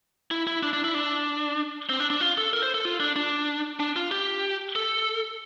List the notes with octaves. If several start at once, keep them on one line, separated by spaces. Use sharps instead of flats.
E4
E4
D4
D4
E4
D4
C4
D4
D4
F4
A4
A#4
C5
A4
F4
D4
D4
D4
F4
G4
A4